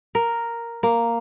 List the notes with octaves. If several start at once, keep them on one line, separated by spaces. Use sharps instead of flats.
A#4
A#3